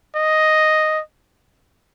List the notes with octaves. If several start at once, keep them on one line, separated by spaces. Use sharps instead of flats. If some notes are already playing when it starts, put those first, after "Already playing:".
D#5